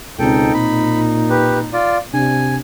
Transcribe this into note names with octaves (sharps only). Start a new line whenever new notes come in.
C#2 B2 C4 D#4 A4 G5
A#2 B5
G4 B4
F4 D5
C3 D4 G#5